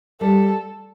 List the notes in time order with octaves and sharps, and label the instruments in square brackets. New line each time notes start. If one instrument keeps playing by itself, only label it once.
[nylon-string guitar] G3 [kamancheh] A4